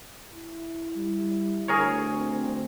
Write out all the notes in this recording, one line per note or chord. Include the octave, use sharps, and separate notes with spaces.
E4
G3
D2 G#4 A#4 C#5
C4